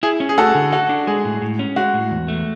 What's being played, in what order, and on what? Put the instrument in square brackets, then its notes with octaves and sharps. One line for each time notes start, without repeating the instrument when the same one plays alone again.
[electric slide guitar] E4 [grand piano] G#4
[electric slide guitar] C#4
[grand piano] G#4
[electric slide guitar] A3 [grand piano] F#4 A4
[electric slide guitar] D3
[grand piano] F#4 [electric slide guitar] A4
[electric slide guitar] D4
[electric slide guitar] G#3 [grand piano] G#4
[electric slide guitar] A2
A2
C#4
[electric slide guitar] G#3 [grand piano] F#4
[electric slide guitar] A2
E2
A3